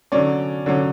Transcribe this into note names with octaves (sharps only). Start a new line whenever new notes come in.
D3 F#3 C#4 D5
D3 F#3 C#4